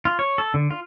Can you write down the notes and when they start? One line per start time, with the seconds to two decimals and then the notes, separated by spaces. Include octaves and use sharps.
0.05 F4
0.19 C#5
0.38 A4
0.54 D3
0.71 F4